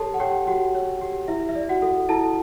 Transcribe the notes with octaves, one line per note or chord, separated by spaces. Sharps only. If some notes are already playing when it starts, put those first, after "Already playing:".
Already playing: G4 A4 C#5 A5
F#5
G4 C#5 G5
F#4 G4 F#5
C#5
G4
E4 E5
E5
D5
F#4 F#5
A4
E4 A4 A5